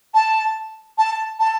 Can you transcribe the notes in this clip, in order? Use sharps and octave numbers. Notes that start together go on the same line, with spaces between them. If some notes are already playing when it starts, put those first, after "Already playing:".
A5
A5
A5